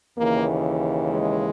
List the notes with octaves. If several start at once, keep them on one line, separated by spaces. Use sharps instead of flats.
D#2 C#3 E3 A#3
G#3